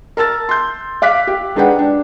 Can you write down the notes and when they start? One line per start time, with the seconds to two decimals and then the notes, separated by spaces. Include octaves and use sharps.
0.17 A#4 A5 E6 A6
0.49 C6 G6
1.02 F5 D6 F#6 B6
1.27 G4
1.56 G#3 D4 D#4 B4 F#5 G5
1.79 D4